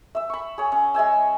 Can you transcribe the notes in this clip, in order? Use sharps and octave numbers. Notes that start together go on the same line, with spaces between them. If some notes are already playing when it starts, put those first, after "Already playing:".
E5 E6
B5 C#6
G#4 C#5
C#4
G#3 E5 G#5 E6